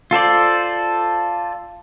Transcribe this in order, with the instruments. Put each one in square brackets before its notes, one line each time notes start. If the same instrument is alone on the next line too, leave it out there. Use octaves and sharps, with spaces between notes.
[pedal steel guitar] F4 A4 C5 D5